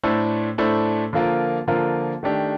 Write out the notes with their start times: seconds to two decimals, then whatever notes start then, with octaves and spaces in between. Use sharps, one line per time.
0.03 A2 A3 D4 A4 C5
0.58 A2 A3 D4 A4 C5
1.13 D3 F3 A#3 F4 A#4
1.67 D3 F3 A#3 F4 A#4
2.23 D#3 A3 D4 G4